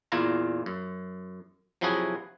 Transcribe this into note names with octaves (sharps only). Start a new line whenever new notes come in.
E2 A#2 E4 F4 F5 A#5
F#2
C3 F3 F#3 E4 F#4 G#4